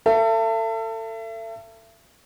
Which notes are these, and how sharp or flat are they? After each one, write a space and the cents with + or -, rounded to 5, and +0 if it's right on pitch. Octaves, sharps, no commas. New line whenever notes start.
A4 +30 E5 +35